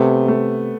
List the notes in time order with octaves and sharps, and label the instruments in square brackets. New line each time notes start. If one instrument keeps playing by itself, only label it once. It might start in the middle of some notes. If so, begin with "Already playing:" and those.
Already playing: [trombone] C3 [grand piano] A3 B3
[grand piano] A3